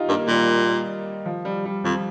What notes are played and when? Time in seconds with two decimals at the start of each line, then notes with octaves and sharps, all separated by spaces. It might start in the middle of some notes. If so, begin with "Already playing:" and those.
Already playing: D#4 F4 G4
0.09 G2 A#3
0.28 A#2 G3
1.26 F3
1.45 G3
1.65 G3
1.84 F2 F3